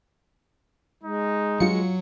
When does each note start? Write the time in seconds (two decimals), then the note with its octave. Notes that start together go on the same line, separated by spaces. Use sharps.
1.04 G#3 D#4
1.60 G2 F#3 F4 C#7